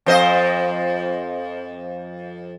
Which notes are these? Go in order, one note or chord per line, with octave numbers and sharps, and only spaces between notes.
F2 C5 D#5